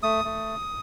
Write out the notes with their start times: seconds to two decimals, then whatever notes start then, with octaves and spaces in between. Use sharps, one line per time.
0.03 A3 D#6
0.25 A3